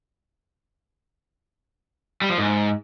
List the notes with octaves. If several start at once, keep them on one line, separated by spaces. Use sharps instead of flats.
G3
F3
G#2